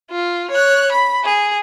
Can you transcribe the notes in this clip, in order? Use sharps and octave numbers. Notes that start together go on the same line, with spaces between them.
F4
C#5 F#6
B5
G#4